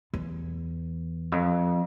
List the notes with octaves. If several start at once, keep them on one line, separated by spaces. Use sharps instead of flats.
E2
F2